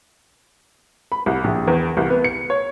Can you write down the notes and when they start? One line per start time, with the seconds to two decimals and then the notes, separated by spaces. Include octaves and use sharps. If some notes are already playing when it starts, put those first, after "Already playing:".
1.12 B5
1.26 C2
1.44 A#1
1.67 E2
1.97 C2
2.10 B3
2.24 C#7
2.50 C#5